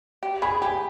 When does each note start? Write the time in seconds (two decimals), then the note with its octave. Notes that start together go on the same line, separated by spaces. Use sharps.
0.23 G4
0.42 G#4 B5
0.62 G4 G#5